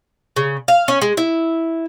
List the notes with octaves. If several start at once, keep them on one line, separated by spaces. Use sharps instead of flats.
C#3
F5
C#4
G#3
E4